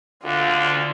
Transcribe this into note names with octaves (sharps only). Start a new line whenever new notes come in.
D2 D3 F4